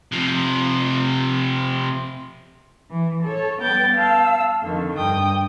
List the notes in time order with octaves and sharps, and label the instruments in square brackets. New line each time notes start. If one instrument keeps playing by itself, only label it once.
[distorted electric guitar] C3 F3
[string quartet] E3
A4 C#5
G3 B3 G5 G6 A6
F5 A5 E6
F2 D3 D#3
G2 G5 D#6